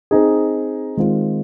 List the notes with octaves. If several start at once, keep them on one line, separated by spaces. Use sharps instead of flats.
C4 D#4 G#4
D#3 G#3 C4 F4